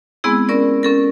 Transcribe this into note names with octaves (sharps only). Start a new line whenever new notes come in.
G#3 B3 C4 E4 G#4
C#4 A#4 D5
C#4 A4 A#4